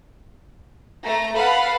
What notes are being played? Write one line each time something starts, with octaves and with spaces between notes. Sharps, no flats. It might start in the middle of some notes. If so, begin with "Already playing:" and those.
A3 A#5
A4 B4 F5 F#5 B5